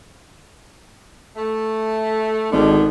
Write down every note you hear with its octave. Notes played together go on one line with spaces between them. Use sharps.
A3
G#1 B2 D3 D#3 D#4